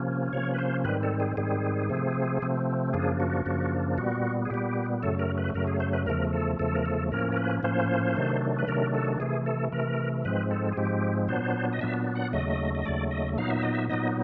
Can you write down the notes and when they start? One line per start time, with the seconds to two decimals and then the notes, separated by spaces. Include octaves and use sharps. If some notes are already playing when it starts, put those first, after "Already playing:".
Already playing: C3 F3 A#3 C#4
0.33 C3 F3 A#3 C#4 C#5
0.54 B4
0.58 C5
0.84 G#2 D#3 G3 C4 B4
1.03 A4
1.20 G#4
1.37 G#2 D#3 G3 C4 G#4
1.90 C3 F3 A3 C4
2.42 C3 F3 A3 C4
2.93 F#2 C#3 F3 A#3 D4 G#4
3.20 F#4
3.45 F#2 C#3 F3 A#3 D4
3.98 A#2 G3 B3 F#4
4.45 G#4
4.50 A#2 G3 B3 G4
5.03 F#2 C#3 F#3 A3 A4
5.19 A#4
5.38 B4
5.55 F#2 C#3 F#3 A3 A#4
5.67 G#4
5.80 C5
5.93 B4
6.06 E2 C#3 F3 A3 A#4
6.33 A4
6.59 E2 C#3 F3 A3 A4
6.75 A#4
6.86 A4
7.11 A2 F3 A#3 C#4 A#4
7.32 A#4
7.37 B4
7.63 A2 F3 A#3 C#4 C5
8.16 C3 D#3 F#3 A3 D4
8.59 B4
8.67 C3 D#3 F#3 A3 D4 A#4
8.94 A4
9.20 C3 E3 A3 G#4
9.46 A4
9.72 C3 E3 A3 A#4
10.24 G#2 F3 G#3 C4 B4
10.51 A4
10.72 G#4
10.77 G#2 F3 G#3 C4 G4
11.28 A#2 F#3 B3 D4 C5
11.73 D#5
11.80 A#2 F#3 B3 D4 E5
12.16 F#5
12.33 D#2 C#3 F#3 A3 D#5
12.75 D#5
12.85 D#2 C#3 F#3 A3 D5
13.11 D#5
13.38 A#2 F#3 B3 D#4 F5
13.50 E5
13.63 D#5
13.75 E5
13.89 A#2 F#3 B3 D#4 D#5